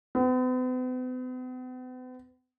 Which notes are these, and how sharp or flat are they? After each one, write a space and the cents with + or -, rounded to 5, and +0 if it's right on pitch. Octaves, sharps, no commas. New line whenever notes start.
B3 +45